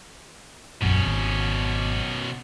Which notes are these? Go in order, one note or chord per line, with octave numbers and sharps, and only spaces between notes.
E1 A#1 F#2 B2 C#4
G#1